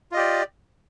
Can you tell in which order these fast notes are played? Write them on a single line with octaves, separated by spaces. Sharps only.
F4 D#5 G4 D5